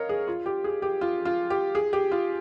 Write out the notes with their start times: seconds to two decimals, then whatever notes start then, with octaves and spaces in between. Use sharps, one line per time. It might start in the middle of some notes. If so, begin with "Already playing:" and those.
Already playing: A#4 C#5 D#5 F5
0.09 G#4
0.28 F4
0.46 G4
0.64 G#4
0.82 G4
1.01 F4
1.25 F4
1.50 G4
1.75 G#4
1.93 G4
2.11 F4